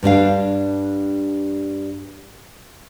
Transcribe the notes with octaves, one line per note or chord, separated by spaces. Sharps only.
G2 G3 D4 F5